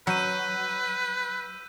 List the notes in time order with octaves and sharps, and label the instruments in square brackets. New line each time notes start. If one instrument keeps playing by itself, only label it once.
[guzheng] F#3 [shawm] B4 [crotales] E6 G6 D#7